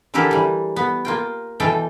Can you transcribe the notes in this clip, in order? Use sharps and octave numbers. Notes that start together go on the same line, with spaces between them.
D3 E3 E4 G4 A4 A#4
E3 G3
B3
A#3 F4 G5
B2 E3 A4 F5 G5